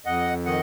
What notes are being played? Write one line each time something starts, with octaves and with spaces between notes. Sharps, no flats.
F2 D#5 F#5
D#3 D#5 F#5